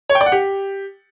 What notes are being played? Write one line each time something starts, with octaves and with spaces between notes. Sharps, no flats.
C#5
G5
D5
F#5
G4